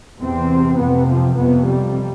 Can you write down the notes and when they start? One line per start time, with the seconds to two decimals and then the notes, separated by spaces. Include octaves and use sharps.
0.21 E2 C3 C4
0.79 F2 C3 B3
1.08 F3
1.37 F2 C3 B3
1.66 G3